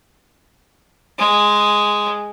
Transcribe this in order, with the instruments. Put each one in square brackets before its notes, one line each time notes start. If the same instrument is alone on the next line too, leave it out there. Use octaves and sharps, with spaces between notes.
[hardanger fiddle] G#3